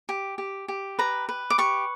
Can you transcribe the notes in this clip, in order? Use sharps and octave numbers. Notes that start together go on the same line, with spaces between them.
G4
G4
G4
B4 A#5
B4
D6
G4 C#6